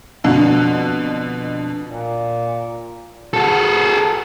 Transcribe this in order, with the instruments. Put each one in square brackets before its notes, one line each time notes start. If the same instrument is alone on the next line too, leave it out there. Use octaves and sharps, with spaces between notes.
[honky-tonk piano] F2 B2 D3
[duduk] A#2
[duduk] F#4 [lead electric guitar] G#4 A4